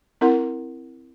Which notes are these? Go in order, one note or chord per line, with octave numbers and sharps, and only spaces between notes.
C4 E4 A#4 F#5 C6